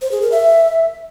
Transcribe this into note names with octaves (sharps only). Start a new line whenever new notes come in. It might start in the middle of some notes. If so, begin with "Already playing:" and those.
C5
G#4
A#4
E5